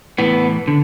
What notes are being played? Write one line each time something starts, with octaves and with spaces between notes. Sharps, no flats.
A2 E3 B3
D3